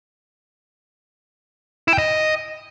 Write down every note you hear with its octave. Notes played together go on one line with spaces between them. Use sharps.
E4
G5
D#5